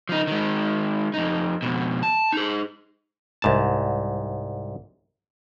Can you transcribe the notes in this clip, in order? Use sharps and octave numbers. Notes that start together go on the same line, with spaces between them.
F3 D#4
D#3 G#3
F2 D#4
F2 B2
A5
D#4 G#4
C2 G#2 A5